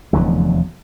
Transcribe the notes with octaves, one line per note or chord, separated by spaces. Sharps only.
F1 E2 D3 F#3